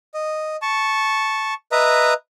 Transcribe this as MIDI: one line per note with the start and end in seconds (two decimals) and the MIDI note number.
0.14 0.56 75
0.62 1.54 81
0.62 1.54 85
1.72 2.14 71
1.72 2.14 75
1.72 2.14 76
1.72 2.14 82